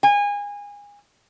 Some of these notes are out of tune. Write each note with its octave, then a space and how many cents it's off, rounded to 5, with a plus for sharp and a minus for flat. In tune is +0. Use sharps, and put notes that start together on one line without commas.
G#5 -25